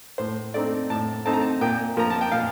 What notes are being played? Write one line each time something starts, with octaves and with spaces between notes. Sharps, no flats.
A2 C5
A3 C4 D#4 D5
A2 A5
A3 C4 D#4 A5
A#5
A5
A#2 G5
F3 A#3 A#5
A5
G5
A#2 F5